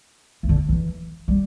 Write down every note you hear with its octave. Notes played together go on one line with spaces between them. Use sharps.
E3
D3
E3
G3